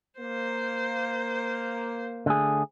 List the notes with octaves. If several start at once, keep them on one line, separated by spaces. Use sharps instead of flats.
A#3 C5
D3 A3 G#4